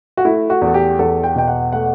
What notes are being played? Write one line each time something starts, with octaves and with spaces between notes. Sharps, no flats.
F#4
A3 E4
F#4
E2
A4
G4
E2 A4
G5
B2 G5
F#5
A3 F#5